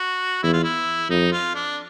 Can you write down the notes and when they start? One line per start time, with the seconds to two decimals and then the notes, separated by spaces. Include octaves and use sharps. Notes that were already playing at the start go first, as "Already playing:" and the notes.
Already playing: F#4
0.43 E2 E4
0.53 F4
0.64 E4
1.10 F2 D#4
1.32 F4
1.55 D4